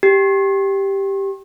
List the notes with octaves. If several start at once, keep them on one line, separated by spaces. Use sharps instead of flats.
G4